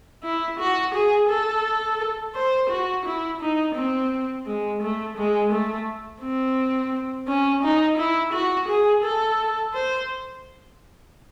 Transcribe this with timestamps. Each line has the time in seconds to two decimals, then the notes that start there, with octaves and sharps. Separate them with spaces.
0.24 E4
0.59 F#4
0.94 G#4
1.29 A4
2.35 C5
2.69 F#4
3.05 E4
3.40 D#4
3.75 C4
4.46 G#3
4.82 A3
5.17 G#3
5.52 A3
6.22 C4
7.27 C#4
7.63 D#4
7.98 E4
8.33 F#4
8.68 G#4
9.04 A4
9.74 C5